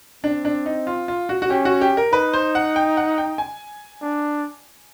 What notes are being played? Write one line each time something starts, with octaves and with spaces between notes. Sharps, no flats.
C4 D4
D4
D#4
F4
F4
F#4
F#4
C#4 G4
F#4
G4
A#4
D#4 B4
C5
F#5
G5
F#5
G5
G#5
D4